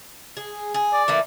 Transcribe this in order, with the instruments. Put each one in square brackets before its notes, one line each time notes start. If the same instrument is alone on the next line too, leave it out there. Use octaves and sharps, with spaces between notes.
[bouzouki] G#4
G#4
[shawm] D5
[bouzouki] E3 A3 A#3